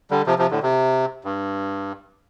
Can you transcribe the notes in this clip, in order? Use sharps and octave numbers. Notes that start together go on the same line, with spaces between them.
D3 G3
C3 F3
C3 F3
A2 D3
C3
G2